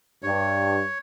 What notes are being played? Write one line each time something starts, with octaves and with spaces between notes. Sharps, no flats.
G2 C#5